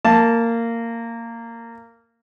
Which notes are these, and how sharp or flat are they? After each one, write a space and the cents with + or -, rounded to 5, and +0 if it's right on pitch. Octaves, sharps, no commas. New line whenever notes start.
A#3 -15 A5 +0